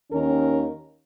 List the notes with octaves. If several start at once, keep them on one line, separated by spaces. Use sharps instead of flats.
D#2 D#3 C#4 A#4